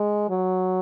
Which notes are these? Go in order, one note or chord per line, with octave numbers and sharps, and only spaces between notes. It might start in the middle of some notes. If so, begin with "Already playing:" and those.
Already playing: G#3
F#3